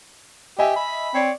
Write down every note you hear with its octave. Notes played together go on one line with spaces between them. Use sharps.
G4 D#5 E5 G#5
B5
C4 C#5 D5